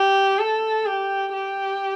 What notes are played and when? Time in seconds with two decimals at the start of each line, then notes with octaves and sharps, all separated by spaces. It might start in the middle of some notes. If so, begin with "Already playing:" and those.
Already playing: G4
0.39 A4
0.86 G4
1.33 G4